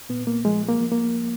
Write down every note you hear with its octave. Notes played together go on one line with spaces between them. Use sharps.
A#2 B3
A#3
F3 G#3
A#3
F3
A#3